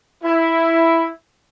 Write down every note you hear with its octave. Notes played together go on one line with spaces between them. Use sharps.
E4